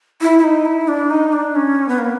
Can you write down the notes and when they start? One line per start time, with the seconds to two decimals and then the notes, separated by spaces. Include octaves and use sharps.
0.22 E4
0.39 E4
0.44 D#4
0.65 E4
0.88 D4
1.10 D#4
1.33 D4
1.55 C#4
1.89 B3
1.98 A#3